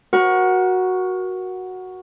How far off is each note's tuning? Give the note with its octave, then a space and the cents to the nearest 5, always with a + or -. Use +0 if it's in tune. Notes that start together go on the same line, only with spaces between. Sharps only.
F#4 +0 A#4 +30